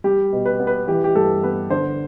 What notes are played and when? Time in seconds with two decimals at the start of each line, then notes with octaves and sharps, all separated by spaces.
0.04 G3 G4
0.32 B2
0.46 B4
0.60 B3
0.67 B4
0.88 E3 G4
1.04 G4
1.15 G2 A4
1.43 B3 B4
1.71 D3 C5